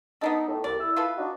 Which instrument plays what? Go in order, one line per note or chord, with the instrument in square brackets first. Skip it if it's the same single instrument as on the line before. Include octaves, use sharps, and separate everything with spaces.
[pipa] B3 D4 A4 [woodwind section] D#4
[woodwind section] A2
[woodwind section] C2 [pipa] D5
[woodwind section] E4 E6
[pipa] F4 A4 B4
[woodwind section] D4 D#4 F#4